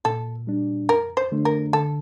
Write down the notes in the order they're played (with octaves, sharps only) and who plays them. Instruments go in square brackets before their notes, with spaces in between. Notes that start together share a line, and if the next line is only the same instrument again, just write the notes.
[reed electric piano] A#2 [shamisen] A4
[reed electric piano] G3 D4
[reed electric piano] F2 [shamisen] A#4
[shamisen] C5
[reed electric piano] D3 A3 D4
[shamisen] A#4
[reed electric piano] D3 [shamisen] A4